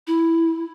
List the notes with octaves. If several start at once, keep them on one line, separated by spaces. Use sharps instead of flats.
E4